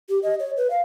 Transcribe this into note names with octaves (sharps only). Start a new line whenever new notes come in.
G4
D#5
C#5
B4
F5